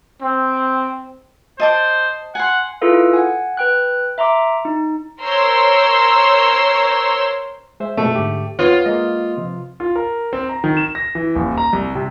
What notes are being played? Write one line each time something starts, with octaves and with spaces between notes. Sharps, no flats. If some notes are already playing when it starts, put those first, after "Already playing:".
C4
C5 D#5 A5 D6
F#5 G#5 C6
E4 F4 G#4 A4 B4 F5
F#5 G#5
B4 G5 F#6
E5 A#5 C6 D6
D#4
A#4 C5 C#5 C6 E6
G#3 C5 E5
F#2 B2 G#3 A3
G#2 D3 G4
D#2 B3 F4 C#5
G#3 A#3 D#5
C3 F3
F4
A#4
C4
A#5
D#3
E7
A#6
E3
D#1
A#5
C2
C3